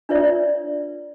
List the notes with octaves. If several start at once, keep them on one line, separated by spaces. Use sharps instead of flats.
D4 F4 B4 C#5 D5 E5